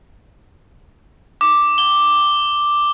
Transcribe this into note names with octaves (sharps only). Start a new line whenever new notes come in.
D6
G7